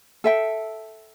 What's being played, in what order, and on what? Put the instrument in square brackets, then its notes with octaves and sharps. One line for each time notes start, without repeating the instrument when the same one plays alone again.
[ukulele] A4 E5 G5